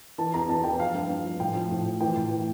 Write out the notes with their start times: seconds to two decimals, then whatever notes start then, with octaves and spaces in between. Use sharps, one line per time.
0.18 E3 A5
0.34 E2 A#5
0.49 E2 A5
0.64 E3 G5
0.79 F3 F5
0.95 G2
1.10 G2
1.25 F3
1.40 A2 G5
1.55 F3
1.71 A2
1.86 F3
2.00 E3 G5
2.16 A2
2.31 E3